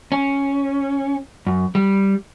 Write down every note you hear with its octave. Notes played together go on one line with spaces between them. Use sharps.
C#4
F#2
G3